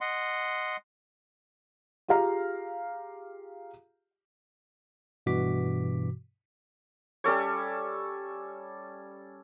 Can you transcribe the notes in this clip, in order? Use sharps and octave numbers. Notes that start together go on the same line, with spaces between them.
D#5 F#5 C6
F4 G4 G#4 F5 A#5
G2 B2 E3 F#4 D6 B6
G3 C#4 A4 C#5